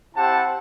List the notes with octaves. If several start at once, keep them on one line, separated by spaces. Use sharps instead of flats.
C4 E4 G4 F#5 A5